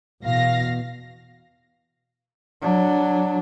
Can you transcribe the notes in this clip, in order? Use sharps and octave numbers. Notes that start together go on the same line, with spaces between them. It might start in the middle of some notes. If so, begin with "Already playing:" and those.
E2 B2 F5 A#6
F#3 D4